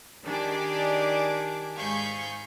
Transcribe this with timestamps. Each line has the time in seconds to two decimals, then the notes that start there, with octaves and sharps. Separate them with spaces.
0.24 D#3 D4 G4 G#4 D5 D6
1.78 G#2 G#4 F5 B5 C#6 G6